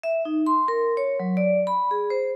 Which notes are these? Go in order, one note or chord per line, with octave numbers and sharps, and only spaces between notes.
E5
D#4
C6
A#4
C#5
F#3
D5
B5
G#4
C5